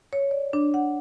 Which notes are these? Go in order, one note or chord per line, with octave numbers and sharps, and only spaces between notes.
C#5
D5
D4
F#5